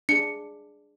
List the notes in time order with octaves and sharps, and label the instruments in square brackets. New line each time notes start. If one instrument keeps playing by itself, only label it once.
[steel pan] D4 G#4 [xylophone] C#7